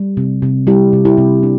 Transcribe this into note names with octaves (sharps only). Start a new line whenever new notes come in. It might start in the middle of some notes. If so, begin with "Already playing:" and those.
Already playing: G3
C3
C3
G3 E4 G4
C3
E4 G4
C3
D4